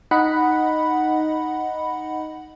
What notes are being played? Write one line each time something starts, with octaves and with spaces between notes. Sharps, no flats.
D#4 D#5 F#5 B5